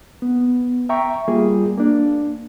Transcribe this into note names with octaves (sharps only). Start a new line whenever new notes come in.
B3
E5 G5 A#5 C#6
G3 A#3 F4 G#4
A#3 D4